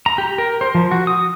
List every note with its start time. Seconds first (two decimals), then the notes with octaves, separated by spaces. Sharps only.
0.06 A#5
0.18 G4
0.38 A#4
0.61 C5
0.75 F3
0.91 F#4
1.07 D#6